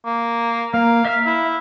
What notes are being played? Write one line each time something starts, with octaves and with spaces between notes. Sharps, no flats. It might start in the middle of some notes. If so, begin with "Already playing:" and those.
A#3
A#3 F5
E5 F6
E4